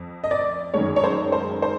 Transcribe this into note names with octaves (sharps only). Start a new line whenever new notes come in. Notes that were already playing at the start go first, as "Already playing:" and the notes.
Already playing: F2
D#5
D5
F#2 D#3 G#3 C#5
C#5
C5
C5
C5